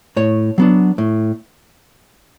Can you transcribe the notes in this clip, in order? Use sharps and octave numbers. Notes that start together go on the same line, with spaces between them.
A2 C#5
F#3 B3 D4
A2